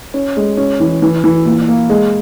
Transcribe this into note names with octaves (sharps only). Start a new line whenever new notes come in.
C#4
G#3
C#4
E3
E3
E3
A#2
A#3
G#3